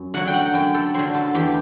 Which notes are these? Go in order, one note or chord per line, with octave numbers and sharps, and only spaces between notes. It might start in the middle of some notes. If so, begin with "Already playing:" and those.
Already playing: F#2
D3 F#3 F#5
G5
F#5
F#2 G5
A4
D3 F#3 C5
A4
E2 G4